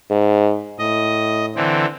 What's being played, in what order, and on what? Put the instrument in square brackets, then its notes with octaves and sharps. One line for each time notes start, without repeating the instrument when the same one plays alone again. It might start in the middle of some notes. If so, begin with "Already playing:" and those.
[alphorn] G#2
[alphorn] A2 [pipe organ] D#5
[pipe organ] D3 E3 C4